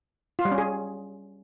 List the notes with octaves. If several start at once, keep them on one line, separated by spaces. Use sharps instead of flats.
F4
G3
C#4
G#4